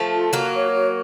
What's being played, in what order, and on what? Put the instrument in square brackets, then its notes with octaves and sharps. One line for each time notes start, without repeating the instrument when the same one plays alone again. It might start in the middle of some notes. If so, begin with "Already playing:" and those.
Already playing: [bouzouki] F3 A3
[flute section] F4
[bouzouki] F#3 A#3 [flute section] F#4
[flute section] C#5
F#4